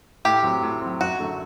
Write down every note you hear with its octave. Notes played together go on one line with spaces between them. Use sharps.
A2 G4
F#3 C4
A2
F#3 C4
F#2 F#4
D3 F#3 A3